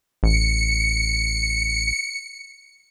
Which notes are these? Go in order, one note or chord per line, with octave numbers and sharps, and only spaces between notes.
A1 C#7